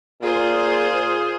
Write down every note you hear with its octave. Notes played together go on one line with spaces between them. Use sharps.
A#2 F4 G#4 C5